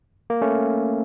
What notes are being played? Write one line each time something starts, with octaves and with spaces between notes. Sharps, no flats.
A#3
A3 C#4